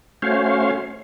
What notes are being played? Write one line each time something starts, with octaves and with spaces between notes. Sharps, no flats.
A3 C#4 F#4 C5 C#5 F5